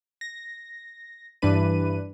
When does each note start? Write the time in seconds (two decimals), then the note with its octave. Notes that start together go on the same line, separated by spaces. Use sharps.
0.21 A#6
1.42 G2 E3 D4 B4 D#7